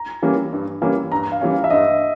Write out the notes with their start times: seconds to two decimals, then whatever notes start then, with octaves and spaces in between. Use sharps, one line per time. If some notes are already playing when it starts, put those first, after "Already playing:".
Already playing: A#5
0.23 E3 G3 A#3 C#4
0.53 G2
0.82 E3 G3 A#3 C#4
1.12 G2 A#5
1.32 F5
1.41 E3 G3 A#3 C#4
1.51 F5
1.64 E5
1.70 G2 D#5